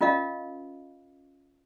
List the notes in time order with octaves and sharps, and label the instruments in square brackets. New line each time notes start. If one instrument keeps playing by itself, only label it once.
[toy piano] C#4 F4 A#4 D#5 F5